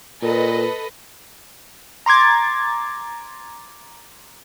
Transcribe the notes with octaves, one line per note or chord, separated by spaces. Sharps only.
A#2 A4 B4 D#5
A#5 C6 D6 G#6 A6